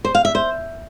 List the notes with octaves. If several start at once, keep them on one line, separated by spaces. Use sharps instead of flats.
C5
F5
E5
C5